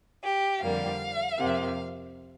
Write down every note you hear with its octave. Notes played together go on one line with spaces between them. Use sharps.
G4
F2 D3 G3 A#3 F5
F2 C3 A#3